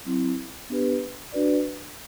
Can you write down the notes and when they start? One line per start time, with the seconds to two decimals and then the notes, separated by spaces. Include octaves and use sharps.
0.05 F#3 C4 E4
0.70 B3 D4 G4 B4
1.32 D4 F#4 B4 D5